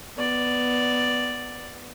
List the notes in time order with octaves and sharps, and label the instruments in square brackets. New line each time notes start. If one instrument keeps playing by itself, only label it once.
[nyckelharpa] B3 D5